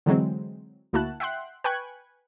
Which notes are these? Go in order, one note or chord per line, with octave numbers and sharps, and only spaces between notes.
D3 E3 F#3 G#3 C4
D2 A#3 E4 F#4 A5 F#6
E5 F#5 G5 C6 F#6
B4 G5 G#5 C#6 F#6 G#6